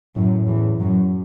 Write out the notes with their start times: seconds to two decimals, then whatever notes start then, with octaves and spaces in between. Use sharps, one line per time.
0.16 F#2 A2 F#3
0.48 E2 E3
0.80 F#2 F#3